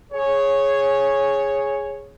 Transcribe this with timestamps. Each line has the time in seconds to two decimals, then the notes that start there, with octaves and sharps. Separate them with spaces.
0.13 G#4 C#5